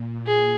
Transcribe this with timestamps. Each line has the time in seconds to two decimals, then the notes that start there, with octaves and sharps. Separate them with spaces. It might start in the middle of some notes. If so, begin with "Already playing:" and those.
Already playing: A#2
0.27 A#2 G#4